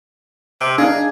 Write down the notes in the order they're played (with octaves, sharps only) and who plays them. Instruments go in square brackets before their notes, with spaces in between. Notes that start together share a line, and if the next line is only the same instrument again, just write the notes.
[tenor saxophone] C3
[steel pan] D4 D#4 F5 [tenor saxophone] G#4